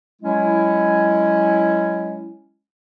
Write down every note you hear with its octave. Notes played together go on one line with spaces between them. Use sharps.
F#3 G#3 C#4 E4